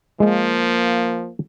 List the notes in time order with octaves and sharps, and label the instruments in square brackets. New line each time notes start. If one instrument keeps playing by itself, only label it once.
[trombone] F3 [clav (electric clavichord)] G#3 [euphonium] A#3